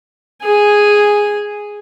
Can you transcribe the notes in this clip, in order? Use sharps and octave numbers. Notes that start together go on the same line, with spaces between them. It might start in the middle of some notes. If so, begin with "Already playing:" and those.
G#4 G#5